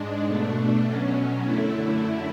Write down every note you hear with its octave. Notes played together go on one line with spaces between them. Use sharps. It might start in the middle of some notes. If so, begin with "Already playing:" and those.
Already playing: G#2 G#3 D4
B2 A3 D4
B2 F#3 C#4
F#2 D3 A3 E4